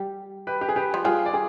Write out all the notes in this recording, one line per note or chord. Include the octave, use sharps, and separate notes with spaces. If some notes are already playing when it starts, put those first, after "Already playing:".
Already playing: G3
G4 B4
G4
G#4
G4 B4
F3
G3 F4 G#4
D5
G#4